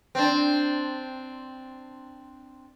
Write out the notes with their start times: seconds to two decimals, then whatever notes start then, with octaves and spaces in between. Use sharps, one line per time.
0.15 C4 D4